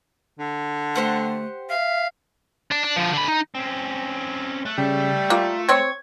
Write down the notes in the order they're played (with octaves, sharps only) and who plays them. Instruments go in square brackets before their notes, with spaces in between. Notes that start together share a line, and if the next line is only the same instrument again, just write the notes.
[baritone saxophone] D3
[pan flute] A3 [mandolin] G4 C5 F#5
[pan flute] E5 [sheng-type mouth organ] F5
[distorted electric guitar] D4
D4
D3 F3
D3 B5
D#4
[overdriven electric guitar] C4 C#4
[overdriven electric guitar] A3 [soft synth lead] F#6
[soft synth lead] C#3 [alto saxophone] G3
[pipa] A#3 [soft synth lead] F4
[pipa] C4 C#5 [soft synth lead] G#6